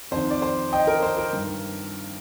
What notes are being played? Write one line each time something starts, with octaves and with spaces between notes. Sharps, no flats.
F2 D#3 C5
D5
C5
D#5 G5
A#4
C5
A#4
G2 D#3